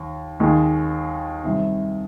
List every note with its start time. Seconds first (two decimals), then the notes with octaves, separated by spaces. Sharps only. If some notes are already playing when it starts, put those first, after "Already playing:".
Already playing: D#2
0.40 D#2 D#3 G#3
1.44 C2 C3 D#3